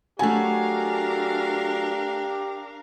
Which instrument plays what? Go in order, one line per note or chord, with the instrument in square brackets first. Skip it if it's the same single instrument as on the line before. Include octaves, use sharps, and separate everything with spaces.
[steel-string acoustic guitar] F#3 F#4 [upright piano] A3 G#5 [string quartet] D4 A#4 F5 [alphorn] G4